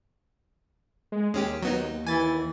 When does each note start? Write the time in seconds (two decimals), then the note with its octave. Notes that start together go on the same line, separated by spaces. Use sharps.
1.12 G#3
1.34 D#2 G#3 C#4 G4
1.63 F#3 B3 D#4
2.07 E3 G#5 A6